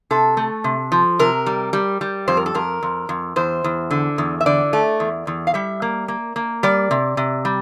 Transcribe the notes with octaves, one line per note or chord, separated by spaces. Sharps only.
C3 A4
A3
C3
F3
C3 A#4
G3
G3
G3
F2 C5
A#4
A4
F2 A#4
F2
F2
E2 C5
E2
D3
E2
E5
D3 D5
A3
E2
E2
F5
G3 E5
A#3
A#3
A#3
G3 D5
C3
C3
G3